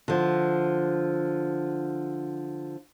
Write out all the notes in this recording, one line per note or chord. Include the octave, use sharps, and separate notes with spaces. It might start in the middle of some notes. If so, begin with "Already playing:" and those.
D3 F3